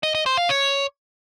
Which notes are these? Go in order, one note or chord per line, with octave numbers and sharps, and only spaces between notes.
D#5
D#5
C5
F5
C#5